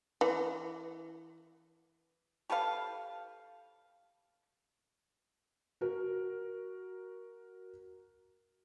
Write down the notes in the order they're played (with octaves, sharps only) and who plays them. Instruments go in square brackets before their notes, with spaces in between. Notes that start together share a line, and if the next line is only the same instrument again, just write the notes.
[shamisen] E3
[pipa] G4 A4 B4 F5
[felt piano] F#4 A#4